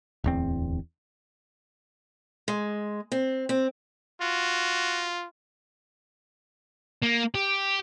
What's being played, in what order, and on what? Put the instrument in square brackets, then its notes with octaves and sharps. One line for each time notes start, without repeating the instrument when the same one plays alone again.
[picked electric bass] D1 E2 C4
[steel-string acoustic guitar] G#3
C4
C4
[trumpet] F4 [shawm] F#4
[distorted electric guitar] A#3
G4